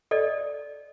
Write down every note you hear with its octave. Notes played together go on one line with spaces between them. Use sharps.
A4 D5 D#5